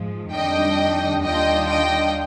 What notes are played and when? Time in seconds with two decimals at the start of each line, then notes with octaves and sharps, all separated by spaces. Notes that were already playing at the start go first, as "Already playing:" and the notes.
Already playing: G#2 F3 G#3
0.32 F2 D#3 G3 D4 D#5 G5
1.23 D#2 D#3 G3 D4 F4 D#5 G5
1.68 D#5 G5